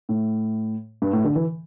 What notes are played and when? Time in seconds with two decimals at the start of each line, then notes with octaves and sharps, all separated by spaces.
0.09 A2
1.02 G2
1.13 A2
1.24 D3
1.35 E3